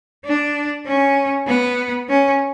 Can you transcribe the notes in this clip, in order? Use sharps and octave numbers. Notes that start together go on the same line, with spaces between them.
D4
C#4
B3
C#4